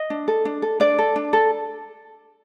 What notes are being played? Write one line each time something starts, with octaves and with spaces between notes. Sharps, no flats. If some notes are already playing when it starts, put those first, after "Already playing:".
Already playing: D#5
D4
A4
D4
A4
D4 D5
A4
D4
A4